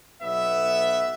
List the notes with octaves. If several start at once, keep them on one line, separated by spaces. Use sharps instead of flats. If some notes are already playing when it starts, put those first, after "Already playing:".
B1 B3 E5